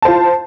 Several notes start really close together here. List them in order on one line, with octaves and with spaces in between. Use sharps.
A5 C5 F4